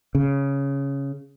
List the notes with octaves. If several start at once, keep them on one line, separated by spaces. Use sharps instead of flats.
C#3